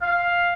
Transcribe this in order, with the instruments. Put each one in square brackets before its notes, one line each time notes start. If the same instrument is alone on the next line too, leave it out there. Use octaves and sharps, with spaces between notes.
[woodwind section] F5